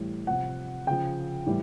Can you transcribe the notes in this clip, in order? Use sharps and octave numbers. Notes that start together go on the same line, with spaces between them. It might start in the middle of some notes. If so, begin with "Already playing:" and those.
Already playing: A2 E3 G3
C3 F3 F#5
C#3 F3 G5
A2 E3 G3